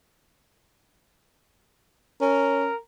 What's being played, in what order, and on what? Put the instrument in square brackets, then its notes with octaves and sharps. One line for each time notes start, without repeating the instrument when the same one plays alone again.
[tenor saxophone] C#4 [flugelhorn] A#4